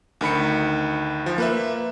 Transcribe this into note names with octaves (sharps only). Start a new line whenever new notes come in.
D2 D#3 B5 C#7
F3
A#3 B4 E5